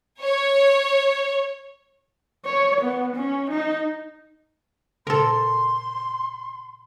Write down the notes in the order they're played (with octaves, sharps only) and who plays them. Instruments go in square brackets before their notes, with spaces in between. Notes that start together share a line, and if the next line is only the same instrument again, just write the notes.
[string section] C#5
[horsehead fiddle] C#5
B3
C#4
D#4
[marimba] A#2 C#3 [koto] A4 A#4 [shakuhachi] C6